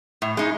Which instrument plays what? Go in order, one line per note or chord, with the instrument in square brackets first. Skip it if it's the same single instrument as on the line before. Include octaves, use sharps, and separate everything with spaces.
[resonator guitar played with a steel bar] A2
G#3 D#4